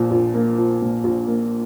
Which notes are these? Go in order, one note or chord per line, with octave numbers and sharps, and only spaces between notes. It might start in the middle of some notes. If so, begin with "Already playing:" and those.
Already playing: A#1 A#2 F3
A#1
A#3
F3
A#2
A#1
A#3